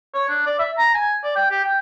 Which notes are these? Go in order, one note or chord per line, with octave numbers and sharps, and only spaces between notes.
C#5
D4
D5
E5
A#5
G#5
D5
G5
G4
G5